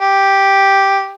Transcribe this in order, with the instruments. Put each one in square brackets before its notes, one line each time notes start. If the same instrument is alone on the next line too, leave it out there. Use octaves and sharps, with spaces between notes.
[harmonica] G4